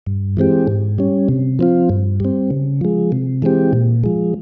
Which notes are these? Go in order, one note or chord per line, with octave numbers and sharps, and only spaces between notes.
G2
E3 G#3 C4 G4
G#2
G3 C#4
C3
F3 C4 F4
G2
G3 C4
C#3
F3 G#3
C3
E3 G#3 C4 G4
A#2
F3 G#3